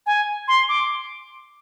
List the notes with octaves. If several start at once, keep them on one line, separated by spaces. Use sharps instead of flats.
G#5
C6
D6